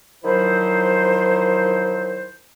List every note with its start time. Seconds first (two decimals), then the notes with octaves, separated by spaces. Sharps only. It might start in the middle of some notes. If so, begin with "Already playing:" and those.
0.23 D#3 F3 F#3 E4 C5